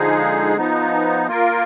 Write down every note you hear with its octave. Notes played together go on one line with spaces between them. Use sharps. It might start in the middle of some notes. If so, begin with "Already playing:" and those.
Already playing: D3 F3 G#3 D#4 G#4
F3 B3 D#4
A#3 F4 A#4